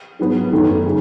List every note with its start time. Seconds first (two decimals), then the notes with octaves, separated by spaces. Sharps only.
0.19 G#2 F#3 B3
0.52 F#2 D#3 A3
0.86 C#3